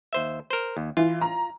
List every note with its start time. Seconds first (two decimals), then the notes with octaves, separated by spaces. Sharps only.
0.13 D#2 C5 E5
0.50 A#4 C5
0.77 D#2
0.97 E3 F4
1.21 A#5